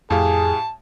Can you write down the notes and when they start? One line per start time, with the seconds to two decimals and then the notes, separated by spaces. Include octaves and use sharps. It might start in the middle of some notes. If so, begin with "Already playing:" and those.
0.10 F2 A2 G4 G#4 F5 A5